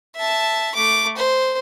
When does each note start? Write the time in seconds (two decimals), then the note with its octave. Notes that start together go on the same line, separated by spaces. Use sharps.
0.16 E5 A5
0.75 A3 D6
1.17 C5